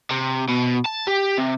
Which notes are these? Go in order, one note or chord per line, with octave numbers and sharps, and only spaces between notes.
C3
B2
A5
G4
C3